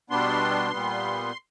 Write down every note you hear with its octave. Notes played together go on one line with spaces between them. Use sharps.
B2 G3 B3 D4 C6
A#2 G3 B3